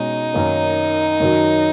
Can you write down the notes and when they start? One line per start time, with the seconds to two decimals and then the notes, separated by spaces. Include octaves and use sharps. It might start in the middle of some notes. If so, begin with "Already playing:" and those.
Already playing: B2 G#3 C#4 D#4
0.34 F#2 D#3 A#3 C#4
1.20 F#2 D#3 F#3